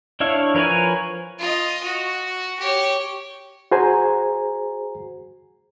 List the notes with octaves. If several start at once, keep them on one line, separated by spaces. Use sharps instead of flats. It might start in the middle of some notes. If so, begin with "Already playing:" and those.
D4 E4 C#5 F5 C#6
F3 A#4 B4 C#5 G#5
F4 D#5
F#4
G4 C#5
F#4 G#4 C5 G#5 A#5